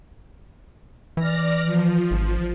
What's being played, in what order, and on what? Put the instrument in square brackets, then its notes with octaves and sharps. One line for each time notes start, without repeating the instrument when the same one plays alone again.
[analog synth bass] E3 [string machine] D5 F6 A#6
[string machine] F3
[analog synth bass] G#1